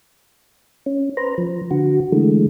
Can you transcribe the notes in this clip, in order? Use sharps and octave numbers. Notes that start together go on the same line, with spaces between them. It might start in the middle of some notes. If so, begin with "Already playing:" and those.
C#4
B4 C5 A#5
F3
D3 F#4
D3 E3 G#3 A3